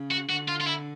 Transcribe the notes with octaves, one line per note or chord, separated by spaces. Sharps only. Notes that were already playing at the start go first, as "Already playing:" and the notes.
Already playing: C#3
F#4
D3 F#4
F4
F4
E4